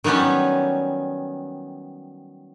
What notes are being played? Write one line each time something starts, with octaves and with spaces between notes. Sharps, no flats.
D#3 F#3 G3 B3 C#4